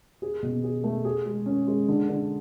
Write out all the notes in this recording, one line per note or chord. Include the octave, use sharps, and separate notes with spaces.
G#4
B2
G#4
A3
G#4
G#3
C#4
G#3
D3
D3